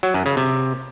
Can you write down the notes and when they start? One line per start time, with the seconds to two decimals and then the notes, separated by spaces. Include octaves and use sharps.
0.03 F#3
0.14 F#2
0.26 C#3
0.37 C3